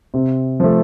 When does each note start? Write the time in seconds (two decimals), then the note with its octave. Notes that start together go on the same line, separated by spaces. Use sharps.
0.14 C3
0.60 F3 A3